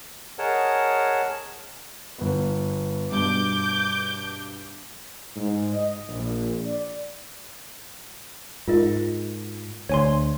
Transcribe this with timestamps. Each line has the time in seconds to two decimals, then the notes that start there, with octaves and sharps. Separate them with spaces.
0.39 G#4 A#4 C#5 D#5 F#5 A5
2.18 G1 B3
3.12 G2 B2 D6 G6
5.36 G#2
5.74 D#5
6.08 A#1
6.65 D5
8.68 G#2 F4 A#4 D#5
9.89 D2 C#5 G#5 C6